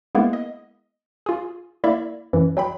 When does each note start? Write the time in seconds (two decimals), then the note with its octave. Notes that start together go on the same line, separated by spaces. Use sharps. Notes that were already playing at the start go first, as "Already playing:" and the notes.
0.15 G#3 A#3 B3 E4
0.33 D#5
1.26 F4 G#4
1.84 A#3 E4 D5 E5
2.33 F#2 E3
2.57 F#3 G5 B5